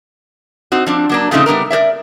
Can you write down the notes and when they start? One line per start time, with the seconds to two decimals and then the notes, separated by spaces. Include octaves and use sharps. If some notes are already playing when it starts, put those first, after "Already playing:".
0.72 C4 D#4 F#4
0.86 F3 C4 D4
1.09 F#3 A#3 D4
1.31 A#2 C#3 F3 A3 C4 D#4
1.46 G3 B3 D4 A#4
1.70 A#4 C5 D5 E5